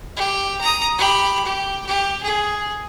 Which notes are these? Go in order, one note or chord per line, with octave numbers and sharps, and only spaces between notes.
G4
A#5 D#6
G4 B5
G4
G4
G#4